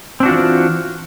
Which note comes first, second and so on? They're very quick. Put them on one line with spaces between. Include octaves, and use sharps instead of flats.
C4 D4 F#4 F4 E3